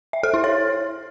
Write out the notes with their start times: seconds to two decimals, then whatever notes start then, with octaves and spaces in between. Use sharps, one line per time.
0.13 E5
0.23 A4
0.34 E4
0.44 C#5